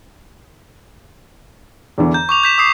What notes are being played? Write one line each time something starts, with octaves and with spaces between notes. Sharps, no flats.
E2 D3 E3
A#5 G6
C#6 D6 F7
G6 B6 E7
D6 D#6 C7